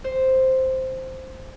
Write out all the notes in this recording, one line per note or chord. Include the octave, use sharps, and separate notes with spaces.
C5